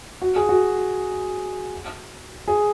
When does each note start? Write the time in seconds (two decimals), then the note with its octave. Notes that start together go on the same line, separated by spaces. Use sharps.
0.22 F#4
0.36 G#4
0.49 F#4
2.48 G#4